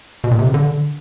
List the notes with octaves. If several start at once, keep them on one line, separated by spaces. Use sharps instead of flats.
B2
A#2
C3
C#3
D3